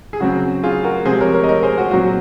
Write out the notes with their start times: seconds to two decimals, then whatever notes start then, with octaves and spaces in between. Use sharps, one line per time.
0.13 G#4
0.20 C#3 F#3 C4 F#4
0.63 F4 G#4
0.84 F#4 A#4
1.05 C3 F3 G#3 C4 G#4 C5
1.21 A#4 C#5
1.34 A#4 C#5
1.44 D#5
1.49 A#4 C#5
1.63 G#4 C5
1.78 F#4
1.91 A#2 F#3 C4 F#4